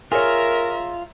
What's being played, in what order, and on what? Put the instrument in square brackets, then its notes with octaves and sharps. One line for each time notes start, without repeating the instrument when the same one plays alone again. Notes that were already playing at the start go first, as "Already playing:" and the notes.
[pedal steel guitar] F4 [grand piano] G#4 C#5 [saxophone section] A#4 [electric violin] E5 A#5